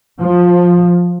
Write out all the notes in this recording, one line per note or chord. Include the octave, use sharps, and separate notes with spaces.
F3